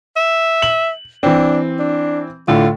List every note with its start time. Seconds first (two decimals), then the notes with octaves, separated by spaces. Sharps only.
0.16 E5
0.62 F#7
1.23 E3 C4 D4
1.79 D4
2.48 A2 D3 A3 F4